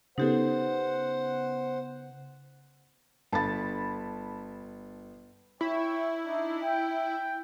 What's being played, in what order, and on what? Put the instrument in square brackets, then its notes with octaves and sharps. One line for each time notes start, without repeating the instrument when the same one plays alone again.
[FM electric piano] C#3 B3 [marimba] D#4 G4 A4 [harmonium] C5 F#5
[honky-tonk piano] G1 [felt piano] A5 B5 A6
[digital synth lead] E4 [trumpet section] C#5 G5 C#6
[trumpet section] D4 D#4
G5